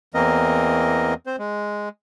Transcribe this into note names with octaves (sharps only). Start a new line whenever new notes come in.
E2 E3 A#3 C4 A#4 D#5
C4 C5
G#3